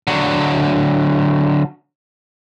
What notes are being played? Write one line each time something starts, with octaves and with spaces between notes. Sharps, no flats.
D3 F#3